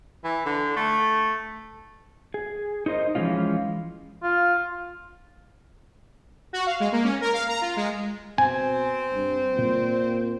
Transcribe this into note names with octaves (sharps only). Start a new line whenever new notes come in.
E3
D3
A3
G#4
D#4 A#4 C5 D#5
E3 F3 G#3 C#4 F4
F4
F#4
F5
G#3
A#3
C#4
A#4
F5
A#5
F4
G#3
B2 C4 G#5
G2
A#2